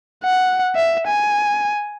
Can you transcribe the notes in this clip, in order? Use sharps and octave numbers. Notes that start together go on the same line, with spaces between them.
F#5
E5
G#5